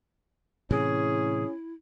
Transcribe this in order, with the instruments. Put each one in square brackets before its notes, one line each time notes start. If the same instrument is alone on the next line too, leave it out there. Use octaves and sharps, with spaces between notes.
[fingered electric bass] A2 C3 E3 [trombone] C#4 [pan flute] E4 [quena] G#4